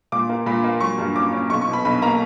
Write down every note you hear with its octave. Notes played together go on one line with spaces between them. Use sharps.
A#2 D6
A#3
A#2 B5
A#3
F#3 C#6
G2
C#4 D6
C#4
B1 C#6
C#6
B2
B5
B1 B5
A#3 A#5